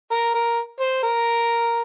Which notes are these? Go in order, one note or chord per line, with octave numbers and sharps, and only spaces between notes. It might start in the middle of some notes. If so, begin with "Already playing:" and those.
A#4
A#4
C5
A#4